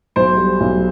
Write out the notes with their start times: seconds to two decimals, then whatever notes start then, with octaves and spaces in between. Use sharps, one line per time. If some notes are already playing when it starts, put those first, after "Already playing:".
0.16 B1 C5
0.37 G3
0.60 B1